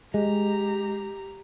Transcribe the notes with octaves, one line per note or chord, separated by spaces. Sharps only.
G#3 G4 A#5